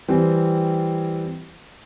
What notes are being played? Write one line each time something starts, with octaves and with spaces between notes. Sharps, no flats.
E3 G3 C4